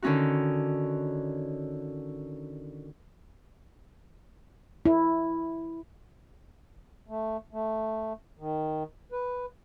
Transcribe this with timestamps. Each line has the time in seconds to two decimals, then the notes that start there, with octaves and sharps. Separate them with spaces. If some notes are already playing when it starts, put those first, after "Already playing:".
0.02 D3 D#3 C#4 D#4 F#4
4.86 E4
7.09 A3
7.53 A3
8.39 D#3
9.12 B4